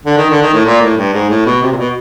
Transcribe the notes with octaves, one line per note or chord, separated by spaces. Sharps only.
D3
D#3
D3
D#3
A2
A#2
A2
G2
G#2
A2
B2
C3
A#2
B2